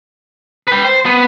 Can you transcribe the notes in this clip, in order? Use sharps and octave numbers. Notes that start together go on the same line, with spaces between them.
B4 G5
C5
B3